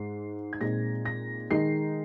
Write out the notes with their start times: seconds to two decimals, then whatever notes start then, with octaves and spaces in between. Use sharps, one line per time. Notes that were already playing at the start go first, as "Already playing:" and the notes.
Already playing: G#2 G#3 D#4 C7
0.53 G#6
0.61 A#2 G#3 C4 D#4 A#6
1.05 A#6
1.50 D#3 G#3 D#4 C7